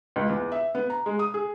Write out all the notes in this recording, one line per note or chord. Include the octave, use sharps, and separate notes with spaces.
C#2
E2
E5
B3
A#5
G#3
D#6
G#4